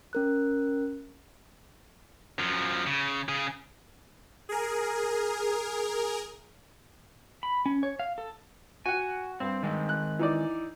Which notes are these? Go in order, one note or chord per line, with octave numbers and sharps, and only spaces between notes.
C#4 A#4 F#6
F#2 F3
C#3
C#3 G#4
G#4 A#4
B5
C#4
C#5
F5
A4
F#4 F#5 G#5
G2 C4
D#3 G#3 C4
F#6
E3 D#4 D5